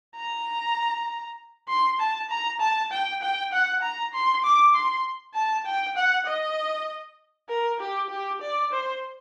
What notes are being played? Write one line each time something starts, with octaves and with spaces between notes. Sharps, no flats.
A#5
C6
A5
A#5
A5
G5
G5
F#5
A#5
C6
D6
C6
A5
G5
F#5
D#5
A#4
G4
G4
D5
C5